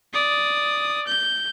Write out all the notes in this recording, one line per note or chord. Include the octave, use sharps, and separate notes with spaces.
D5 D#6
G6